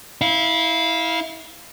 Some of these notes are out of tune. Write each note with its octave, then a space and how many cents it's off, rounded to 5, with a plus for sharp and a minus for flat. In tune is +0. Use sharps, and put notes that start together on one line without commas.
E4 -25 F5 -5